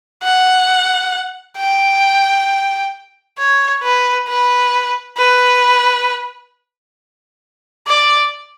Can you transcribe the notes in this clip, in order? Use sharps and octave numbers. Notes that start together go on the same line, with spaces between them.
F#5
G5
C#5
B4
B4
B4
D5